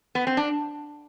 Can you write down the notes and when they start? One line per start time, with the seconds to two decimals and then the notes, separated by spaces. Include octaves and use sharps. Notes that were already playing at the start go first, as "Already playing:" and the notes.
0.15 B3
0.27 C4
0.37 D4